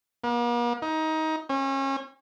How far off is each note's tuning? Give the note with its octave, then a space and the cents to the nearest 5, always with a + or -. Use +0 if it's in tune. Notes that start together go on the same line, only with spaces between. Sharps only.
A#3 +45
D#4 +20
C#4 -35